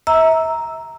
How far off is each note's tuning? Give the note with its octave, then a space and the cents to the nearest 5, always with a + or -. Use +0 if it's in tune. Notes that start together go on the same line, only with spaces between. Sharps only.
E5 -35 A#5 +0 E6 +0